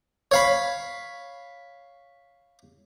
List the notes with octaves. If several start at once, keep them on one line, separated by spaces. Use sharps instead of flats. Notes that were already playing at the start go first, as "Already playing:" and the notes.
C#5 F5 B5